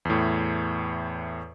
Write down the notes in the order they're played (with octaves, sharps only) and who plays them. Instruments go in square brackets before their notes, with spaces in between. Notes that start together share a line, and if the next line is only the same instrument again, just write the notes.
[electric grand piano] E2 A2